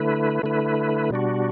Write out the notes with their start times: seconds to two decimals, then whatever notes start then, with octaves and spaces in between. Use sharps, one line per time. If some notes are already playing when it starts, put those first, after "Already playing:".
Already playing: D3 A3 E4 B4
0.43 D3 A3 E4 B4
1.10 B2 G3 D4 F#4